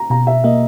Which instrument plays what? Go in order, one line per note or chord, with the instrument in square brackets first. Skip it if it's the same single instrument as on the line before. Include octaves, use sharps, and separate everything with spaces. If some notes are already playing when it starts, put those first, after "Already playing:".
Already playing: [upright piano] A#5
[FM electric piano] B2 [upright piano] A#5
[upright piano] E5
[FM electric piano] A#3 [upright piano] D#5